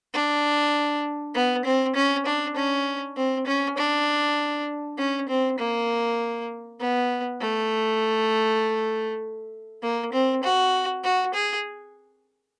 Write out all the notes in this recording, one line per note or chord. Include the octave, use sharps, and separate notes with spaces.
D4
B3
C4
C#4
D4
C#4
C4
C#4
D4
C#4
C4
A#3
B3
A3
A#3
C4
F#4
F#4
G#4